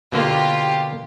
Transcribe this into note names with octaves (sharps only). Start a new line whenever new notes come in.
B2 D3 A#3 F4 G4